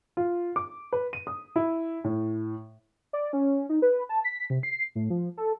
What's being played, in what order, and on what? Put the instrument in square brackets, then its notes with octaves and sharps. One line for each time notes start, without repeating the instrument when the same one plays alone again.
[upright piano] F4
D6
B4
D#7
D#6
E4
A2
[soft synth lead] D5
C#4
D#4
B4
A5
B6
C3
C7
A2
F3
A4